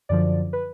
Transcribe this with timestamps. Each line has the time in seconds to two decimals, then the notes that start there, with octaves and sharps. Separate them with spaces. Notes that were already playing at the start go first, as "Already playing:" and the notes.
0.09 F#2 D3 F3 D5
0.53 B4